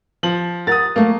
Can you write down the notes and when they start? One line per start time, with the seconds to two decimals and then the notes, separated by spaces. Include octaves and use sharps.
0.23 F3 F#7
0.67 A#4 F#5 D#6 A6
0.96 F#3 A3 A#3